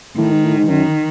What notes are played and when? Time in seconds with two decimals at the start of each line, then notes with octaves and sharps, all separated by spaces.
0.17 A2 D#3
0.31 G#2
0.43 A2
0.56 G#2
0.68 F#2 D#3